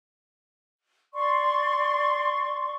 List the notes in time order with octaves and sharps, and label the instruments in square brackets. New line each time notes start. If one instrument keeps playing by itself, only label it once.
[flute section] D5 C6 C#6